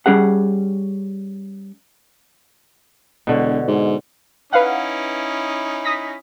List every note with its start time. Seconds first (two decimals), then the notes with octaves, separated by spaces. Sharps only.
0.06 G3 C#4 G#4 F#5
3.27 E1 B2 D3 C#5
3.68 G#2
4.53 C#4 D#4 E4 B4 F5 F#5
5.84 D#6 A#6 B6